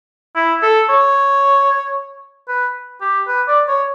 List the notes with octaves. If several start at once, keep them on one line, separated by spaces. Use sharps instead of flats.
E4
A4
C#5
B4
G4
B4
D5
C#5